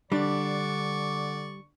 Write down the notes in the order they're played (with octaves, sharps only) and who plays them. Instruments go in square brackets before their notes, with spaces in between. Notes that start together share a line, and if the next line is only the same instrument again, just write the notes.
[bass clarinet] D3 [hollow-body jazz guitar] G3 [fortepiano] D4 [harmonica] D5 C#6